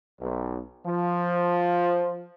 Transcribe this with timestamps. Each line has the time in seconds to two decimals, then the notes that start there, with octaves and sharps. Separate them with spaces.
0.21 B1
0.85 F3